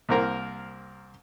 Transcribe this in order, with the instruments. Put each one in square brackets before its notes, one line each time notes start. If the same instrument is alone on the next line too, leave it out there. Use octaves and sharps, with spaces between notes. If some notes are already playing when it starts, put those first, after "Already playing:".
[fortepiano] C2 A#3 C4 A#4 A#5